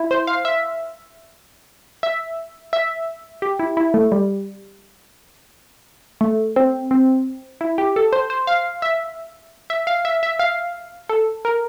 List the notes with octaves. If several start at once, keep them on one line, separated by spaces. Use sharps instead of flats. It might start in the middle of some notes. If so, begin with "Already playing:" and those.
Already playing: E4
C5
F5
E5
E5
E5
G4
E4
E4
A3
G3
A3
C4
C4
E4
G4
A4
C5
C5
F5
E5
E5
F5
E5
E5
F5
A4
A#4